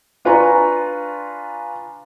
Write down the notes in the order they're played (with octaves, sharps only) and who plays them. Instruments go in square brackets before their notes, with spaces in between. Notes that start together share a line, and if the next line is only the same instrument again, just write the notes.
[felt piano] D4 F4 B4 G#5 A#5 C#6